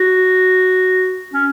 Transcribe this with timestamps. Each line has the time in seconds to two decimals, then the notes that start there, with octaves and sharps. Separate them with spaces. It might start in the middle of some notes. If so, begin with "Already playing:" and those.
Already playing: F#4
1.34 C#4